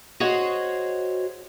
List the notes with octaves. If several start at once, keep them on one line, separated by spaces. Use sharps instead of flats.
F#4 G#4 C5 C#5 D#5